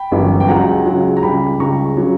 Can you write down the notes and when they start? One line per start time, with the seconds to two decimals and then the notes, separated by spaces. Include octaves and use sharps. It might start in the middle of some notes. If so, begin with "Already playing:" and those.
Already playing: G5 B5
0.12 G1 F#2 E3 G3
0.40 G5
0.48 C#2 C#3 F#3 F#5 A#5
0.86 C#2 C#3 F#3
1.17 A#5
1.23 C#2 C#3 G3 G5 B5
1.60 C#2 C#3 G3 A#5 C#6
1.97 C#3 F#3